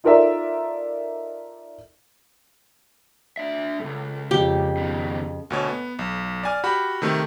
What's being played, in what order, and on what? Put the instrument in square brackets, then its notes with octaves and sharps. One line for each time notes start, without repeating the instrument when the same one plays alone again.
[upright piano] D#4 F4 A4 A#4 D5 E5
[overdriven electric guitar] D4 E5
[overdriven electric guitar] C#2 G2 [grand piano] A4
[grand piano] F2 C#3 F5 [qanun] G4
[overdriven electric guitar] B2 D#3
[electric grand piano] D2 B2 C#5
B3
B1
D5 G#5 F6
F#4 G4 B5
C3 D#3 A3